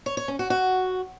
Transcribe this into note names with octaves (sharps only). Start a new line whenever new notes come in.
C#5
C#5
C#4
F#4
F#4